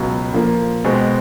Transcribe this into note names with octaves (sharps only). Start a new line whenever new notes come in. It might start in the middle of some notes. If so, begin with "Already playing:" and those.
Already playing: C#2 B2 F#3
A#2 F3 A#3
B2 G#3 C4